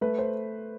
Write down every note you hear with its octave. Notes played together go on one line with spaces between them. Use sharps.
A3 B4
C5